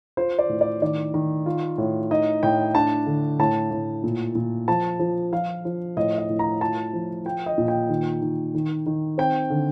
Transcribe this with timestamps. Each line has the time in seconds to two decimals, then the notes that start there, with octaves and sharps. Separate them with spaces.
0.17 F4 C5
0.39 D5
0.49 A2
0.61 D5
0.82 D#3 D5
1.14 D#3
1.46 F4
1.78 A2
2.11 D#4 D#5
2.43 A2 G5
2.75 D4 A5
3.07 D3
3.39 A2 A5
3.71 A2
4.04 A#2
4.35 A#2
4.68 F3 A5
4.99 F3
5.33 F3 F5
5.65 F3
5.97 A2 D#5
6.18 D#5
6.29 A2
6.39 A#5
6.61 F4 A5
6.93 F3
7.25 F4 G5
7.46 D#5
7.58 A#2
7.68 G5
7.89 D#3
8.22 D#3
8.54 D#3
8.86 D#3
9.18 C4 G5
9.50 D3